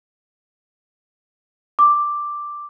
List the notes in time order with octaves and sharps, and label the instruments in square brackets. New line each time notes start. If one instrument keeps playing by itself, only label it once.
[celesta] D6